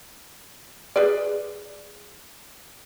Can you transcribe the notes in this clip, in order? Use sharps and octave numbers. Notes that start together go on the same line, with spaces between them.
G#4 B4 D5